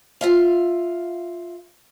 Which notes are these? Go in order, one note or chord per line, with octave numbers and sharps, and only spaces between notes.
F4 E5 F5